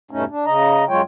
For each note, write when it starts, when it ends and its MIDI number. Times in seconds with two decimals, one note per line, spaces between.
0.11 0.24 40
0.11 0.24 43
0.11 0.24 47
0.11 0.24 57
0.11 0.24 61
0.11 0.24 63
0.30 0.45 62
0.46 0.84 49
0.46 0.84 75
0.46 0.84 82
0.89 1.01 42
0.89 1.01 54
0.89 1.01 56
0.89 1.01 65
0.89 1.01 73
0.89 1.01 79